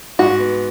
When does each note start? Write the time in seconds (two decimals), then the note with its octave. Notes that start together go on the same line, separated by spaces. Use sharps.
0.19 G#2 F#4
0.39 B3